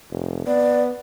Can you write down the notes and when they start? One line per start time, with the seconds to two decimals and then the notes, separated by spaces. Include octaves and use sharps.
0.11 F1
0.47 B3 D5